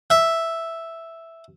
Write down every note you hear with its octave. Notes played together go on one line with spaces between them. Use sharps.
E5